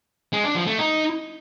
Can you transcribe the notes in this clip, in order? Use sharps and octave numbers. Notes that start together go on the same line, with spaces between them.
G#3
D4
F3
A3
D#4